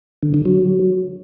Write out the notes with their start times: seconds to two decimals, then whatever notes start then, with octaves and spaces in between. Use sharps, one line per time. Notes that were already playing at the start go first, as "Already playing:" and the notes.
0.22 D3
0.34 D3
0.45 F#3